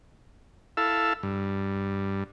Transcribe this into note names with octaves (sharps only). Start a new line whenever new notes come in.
E4 A4 F5 E6
G2